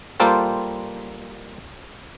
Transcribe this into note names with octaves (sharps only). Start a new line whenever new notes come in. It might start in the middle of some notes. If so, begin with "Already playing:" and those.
G3 A#3 F4 A4 C5 G5